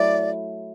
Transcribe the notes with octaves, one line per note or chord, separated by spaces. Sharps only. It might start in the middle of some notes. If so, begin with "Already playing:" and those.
Already playing: F#3 A3 E4 D5